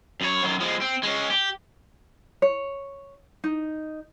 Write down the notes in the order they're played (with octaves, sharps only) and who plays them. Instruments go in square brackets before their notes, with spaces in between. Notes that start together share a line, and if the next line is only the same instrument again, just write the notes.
[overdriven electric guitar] F#2 C#5
F#2 D#3
F3 G#3
C4
G#3 C#4
G4
[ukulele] C#5
D#4